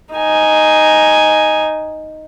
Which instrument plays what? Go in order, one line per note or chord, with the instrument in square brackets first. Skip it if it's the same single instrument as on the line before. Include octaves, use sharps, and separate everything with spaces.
[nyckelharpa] D#4 G#5